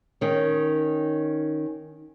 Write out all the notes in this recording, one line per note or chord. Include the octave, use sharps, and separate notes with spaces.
D#3 C#4